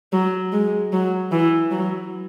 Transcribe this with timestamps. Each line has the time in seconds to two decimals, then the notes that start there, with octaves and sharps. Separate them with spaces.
0.13 F#3
0.52 G#3
0.92 F#3
1.32 E3
1.71 F#3